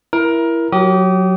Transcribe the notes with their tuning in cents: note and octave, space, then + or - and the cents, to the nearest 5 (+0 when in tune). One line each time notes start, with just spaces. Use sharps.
E4 +15 A#4 +20
F#3 -5 G4 -30 D#6 -15